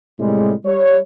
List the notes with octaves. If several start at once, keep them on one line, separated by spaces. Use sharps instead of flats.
A2 C3 G3 G#3
G3 C#5